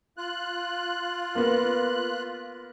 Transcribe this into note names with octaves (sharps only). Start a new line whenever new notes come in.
F4 F#6
A#3 B3